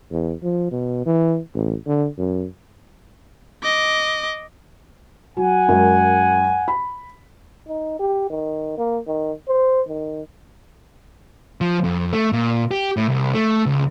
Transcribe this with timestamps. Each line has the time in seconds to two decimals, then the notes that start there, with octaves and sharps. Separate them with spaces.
0.11 E2
0.43 F3
0.71 B2
1.06 E3
1.54 A1
1.86 D3
2.18 F#2
3.63 D#5 D6
5.37 F#3 F#5 G#5
5.68 F#2 G#3 A#4
6.68 B5
7.68 D#4
8.00 G4
8.30 D#3
8.78 A#3
9.07 D#3
9.48 C5
9.88 D#3
11.61 F3
11.84 F2
12.13 A3
12.32 A#2
12.71 G4
12.97 A2
13.08 C2
13.34 A3
13.66 C#2